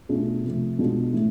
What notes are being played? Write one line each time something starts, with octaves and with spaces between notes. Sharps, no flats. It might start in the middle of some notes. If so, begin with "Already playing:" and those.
B2 A3 D4 F4 G#4
C3 F3 A3
B2 G#3 D4 F4
A2 E3 A3